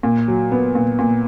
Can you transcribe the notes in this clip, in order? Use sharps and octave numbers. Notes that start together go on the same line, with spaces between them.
A#2
F#3
B3
A#2
A#2